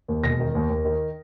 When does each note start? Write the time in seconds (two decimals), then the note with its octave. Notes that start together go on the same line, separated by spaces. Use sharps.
0.08 D#2
0.23 E1 A#6
0.40 D#3
0.55 D#2
0.70 D#2
0.85 D#3